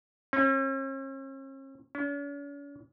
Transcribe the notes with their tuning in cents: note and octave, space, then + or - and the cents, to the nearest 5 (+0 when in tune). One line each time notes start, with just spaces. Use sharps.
C#4 -45
C#4 +45